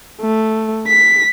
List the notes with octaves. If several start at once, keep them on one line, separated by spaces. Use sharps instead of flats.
A3
B6